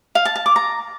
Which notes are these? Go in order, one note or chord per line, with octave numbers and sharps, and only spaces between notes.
F5
A5
A5
D6
A#5